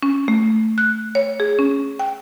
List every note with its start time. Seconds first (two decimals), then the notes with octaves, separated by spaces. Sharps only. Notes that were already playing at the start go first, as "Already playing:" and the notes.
0.03 C#4
0.28 A3
0.78 F#6
1.15 C#5
1.40 G#4
1.59 C#4
1.99 G5